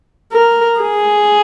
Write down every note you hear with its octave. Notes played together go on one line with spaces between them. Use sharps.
A#4
G#4